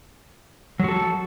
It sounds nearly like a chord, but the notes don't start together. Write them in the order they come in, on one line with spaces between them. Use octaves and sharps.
F#3 F#4 A4